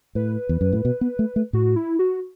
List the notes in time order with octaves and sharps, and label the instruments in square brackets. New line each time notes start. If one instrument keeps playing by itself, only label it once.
[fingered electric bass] A2 [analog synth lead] B4
[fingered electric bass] E2
F#2
A2
B2
B3
A3
A3
[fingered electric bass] A2 [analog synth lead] F#4
[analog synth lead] E4
F#4